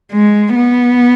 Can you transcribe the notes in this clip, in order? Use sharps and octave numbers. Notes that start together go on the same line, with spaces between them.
G#3
B3